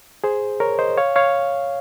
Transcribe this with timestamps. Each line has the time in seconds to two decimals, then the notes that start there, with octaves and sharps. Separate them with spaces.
0.24 G#4 C5
0.60 A#4 C#5
0.79 C5 D#5
0.97 C#5 F5
1.16 C#5 F5